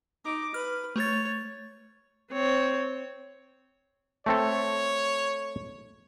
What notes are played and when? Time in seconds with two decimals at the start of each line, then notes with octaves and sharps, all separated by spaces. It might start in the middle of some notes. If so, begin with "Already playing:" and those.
0.25 D#4 D6
0.54 B4 F6
0.96 A3 C#5 A6
2.31 C4 C#5
4.26 A3 C4 A4 C#5